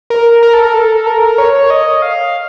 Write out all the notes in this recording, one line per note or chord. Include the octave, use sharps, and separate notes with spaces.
A#4
A#4
A4
A#4
A4
A#4
C#5
D#5
F5